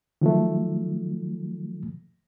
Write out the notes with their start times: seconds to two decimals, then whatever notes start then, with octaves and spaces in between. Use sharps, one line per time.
0.21 D#3 F3 F#3 A3